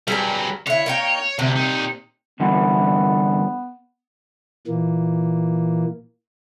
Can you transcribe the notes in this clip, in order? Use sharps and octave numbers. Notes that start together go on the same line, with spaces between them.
G2 F#3 G3 G#4 A#4
D3 E4 C#5
A#3 D#4 G5
D2 C3
A#2 D#4
G2 D3 E3 B3
A#2 E3 A#3